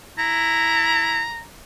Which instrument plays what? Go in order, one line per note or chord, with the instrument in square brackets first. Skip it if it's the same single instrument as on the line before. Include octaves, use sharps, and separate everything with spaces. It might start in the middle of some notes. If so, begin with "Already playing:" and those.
[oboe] E4 [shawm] A#5